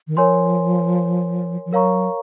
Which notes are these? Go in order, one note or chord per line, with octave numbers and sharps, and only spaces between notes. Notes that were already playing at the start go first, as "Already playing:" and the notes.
D#3
F3 A#4 C#5 G#5 C6
F3
F#3 A#4 C#5 F5 A#5 C#6